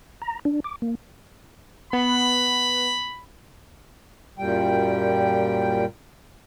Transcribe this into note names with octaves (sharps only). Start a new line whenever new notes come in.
A#5
D4
D6
A#3
B3 B5
F#2 A#2 G3 G5